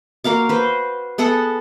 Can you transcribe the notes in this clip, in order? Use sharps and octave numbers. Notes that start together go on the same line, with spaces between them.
A#3 F#4 F5 D6
B4 C5
B3 G#4 A4 F#5